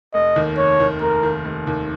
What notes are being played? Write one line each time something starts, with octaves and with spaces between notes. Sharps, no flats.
F1 D#5
D#2 D#3
F1 C#5
D#2 D#3
F1 A#4
D#2 D#3
F1
D#2 D#3